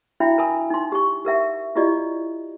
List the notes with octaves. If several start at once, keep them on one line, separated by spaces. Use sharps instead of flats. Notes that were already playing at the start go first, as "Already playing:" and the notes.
D4 E4 F#4 E5 G5 B5
A#4 G#5 B5 D#6
D#4 C6
G4 C#6
G4 A#4 E5 F#5
E4 F4 G4 D5 D#5